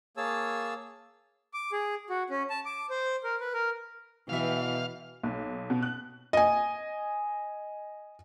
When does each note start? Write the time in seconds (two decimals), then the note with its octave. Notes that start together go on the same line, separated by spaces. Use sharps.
0.17 A#3 G#4 C#5 A5 E6
1.54 D6
1.72 G#4
2.10 F#4
2.30 C#4
2.50 A5
2.66 D6
2.90 C5
3.24 A#4
3.41 B4
3.53 A#4
4.29 E2 B2 E3 E5 F5
5.23 B1
5.70 B2
5.83 F#6
6.33 D#5 G#5